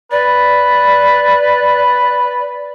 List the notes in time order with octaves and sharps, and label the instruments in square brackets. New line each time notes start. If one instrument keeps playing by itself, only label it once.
[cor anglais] B4 [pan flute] D5